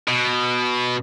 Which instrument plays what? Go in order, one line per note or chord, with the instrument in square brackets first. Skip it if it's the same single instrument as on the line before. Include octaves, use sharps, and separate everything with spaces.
[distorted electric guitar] B2